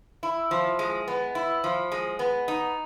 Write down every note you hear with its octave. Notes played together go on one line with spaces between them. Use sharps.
E4
F3
G#3
B3
E4
F3
G#3
B3
D#4